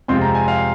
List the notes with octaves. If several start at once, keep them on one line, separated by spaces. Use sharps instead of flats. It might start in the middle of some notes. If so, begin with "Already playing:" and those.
F2 C3 G#3 C4 F4 C6
A#5
G#5
F5